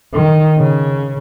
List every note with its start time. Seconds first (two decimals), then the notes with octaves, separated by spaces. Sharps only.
0.14 D#3
0.58 C#3